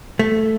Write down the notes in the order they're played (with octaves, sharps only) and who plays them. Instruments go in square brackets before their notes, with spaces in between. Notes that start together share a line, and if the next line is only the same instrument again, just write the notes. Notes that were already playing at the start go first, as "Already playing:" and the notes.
[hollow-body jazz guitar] A3